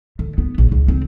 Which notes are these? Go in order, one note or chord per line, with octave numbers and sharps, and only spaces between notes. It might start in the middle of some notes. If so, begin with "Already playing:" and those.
D3
B3
A#1
C#2
C4